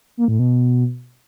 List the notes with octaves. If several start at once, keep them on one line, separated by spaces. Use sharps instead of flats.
A#3
A2
B2